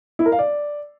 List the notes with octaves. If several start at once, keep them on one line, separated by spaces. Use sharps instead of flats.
E4
A#4
F5
D5